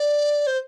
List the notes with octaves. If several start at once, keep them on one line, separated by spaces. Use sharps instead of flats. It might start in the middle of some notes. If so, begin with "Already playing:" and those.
Already playing: D5
C5